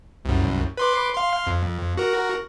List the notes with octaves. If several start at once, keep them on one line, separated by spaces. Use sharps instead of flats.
C2 F#2
B4 C6 D6
F5 C6
F2
F#4 A#4